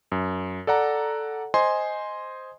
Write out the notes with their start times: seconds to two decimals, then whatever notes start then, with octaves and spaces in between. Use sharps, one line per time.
0.12 F#2
0.67 A4 D5 F#5 A#5
1.54 C5 D#5 G#5 C6